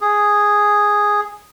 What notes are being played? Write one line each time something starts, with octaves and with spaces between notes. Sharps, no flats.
G#4